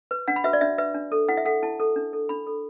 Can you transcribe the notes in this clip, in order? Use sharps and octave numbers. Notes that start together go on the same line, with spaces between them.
B4
D4 F#5
B5
F#4 B4 E5
D5
D4 E5
B4 E5
D4
A4
E4 F#5
E5
A4 F#5
E4 A5
A4
D4
A4
D4 B5
A4